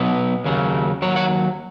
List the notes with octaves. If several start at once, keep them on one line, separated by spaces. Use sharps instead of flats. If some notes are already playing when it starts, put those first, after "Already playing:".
Already playing: B2 F#3 B3 B4 D#5
D#2 C#3 F#3
D#2 C#3 F#3 C#5 F#5
C#5 F#5